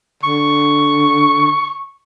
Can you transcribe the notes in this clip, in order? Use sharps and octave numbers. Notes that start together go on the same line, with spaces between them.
D3 C#6